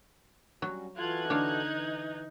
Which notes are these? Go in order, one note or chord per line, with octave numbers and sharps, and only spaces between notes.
F#3 G3 C#4 F#4
E3 F4 F#4 A4 F#6 G#6
D3 D#4 C#5 F5
E3